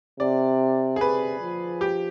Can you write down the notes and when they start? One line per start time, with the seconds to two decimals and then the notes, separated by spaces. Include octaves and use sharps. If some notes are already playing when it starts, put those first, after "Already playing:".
0.20 C3 D5
0.96 G#4
1.01 C3 B4
1.41 F3
1.81 G4